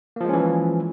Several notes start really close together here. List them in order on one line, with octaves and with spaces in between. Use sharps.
A#3 F3 G#3 C#4 E3